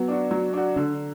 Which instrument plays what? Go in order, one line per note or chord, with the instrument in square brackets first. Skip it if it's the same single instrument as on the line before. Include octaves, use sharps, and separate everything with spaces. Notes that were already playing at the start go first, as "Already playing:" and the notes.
Already playing: [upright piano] F#3 [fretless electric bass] B3
[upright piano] D4 F#4
F#3
D4 F#4
[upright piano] D3 [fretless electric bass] D4